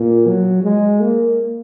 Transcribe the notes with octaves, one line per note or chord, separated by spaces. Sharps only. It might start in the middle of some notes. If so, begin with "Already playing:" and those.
Already playing: A#2
F#3
G#3
A#3